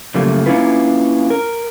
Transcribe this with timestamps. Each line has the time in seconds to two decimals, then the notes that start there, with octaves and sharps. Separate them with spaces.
0.14 F#2 C#3 F3 G3 A3 A#3
0.46 A#3 C#4 D4 E4 F4 B4
1.30 A#4